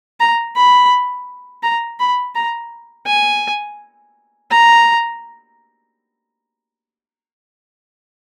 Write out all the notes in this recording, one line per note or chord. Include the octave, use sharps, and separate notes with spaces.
A#5
B5
A#5
B5
A#5
G#5
A#5